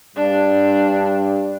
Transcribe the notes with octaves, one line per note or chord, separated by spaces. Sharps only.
G2 D4